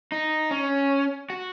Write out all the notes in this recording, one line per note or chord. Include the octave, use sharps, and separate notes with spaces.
D#4
C#4
F#4